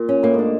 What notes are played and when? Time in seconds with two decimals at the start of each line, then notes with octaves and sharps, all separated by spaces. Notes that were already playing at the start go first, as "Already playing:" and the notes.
Already playing: A#2
0.09 C#4
0.23 A2 A#3
0.34 G#2 D4